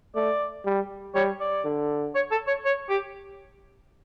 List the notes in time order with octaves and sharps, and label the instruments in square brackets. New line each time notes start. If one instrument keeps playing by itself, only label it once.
[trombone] A3 [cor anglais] D5
[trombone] G3
[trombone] G3 [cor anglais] C#5
[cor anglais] D5
[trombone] D3
[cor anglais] C#5
A4
C#5
C#5
G4